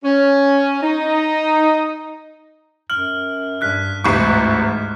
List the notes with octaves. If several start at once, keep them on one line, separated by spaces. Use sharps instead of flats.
C#4
D#4
F#2 F6 F#7
G2 F6 F#6 B6
A1 D2 G#2 C3 C#6